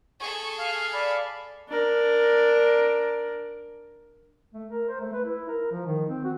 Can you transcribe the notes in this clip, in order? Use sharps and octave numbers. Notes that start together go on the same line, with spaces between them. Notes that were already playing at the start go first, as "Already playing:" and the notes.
G#4 A4 C#6
F5
D5 B5
D4 A#4
A3
A#4
C5
A3
B4
E4
A#4
F3
D#3
C4
F#4